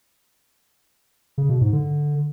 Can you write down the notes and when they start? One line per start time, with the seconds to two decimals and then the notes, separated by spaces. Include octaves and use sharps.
1.38 C#3
1.49 B2
1.61 G#2
1.73 D3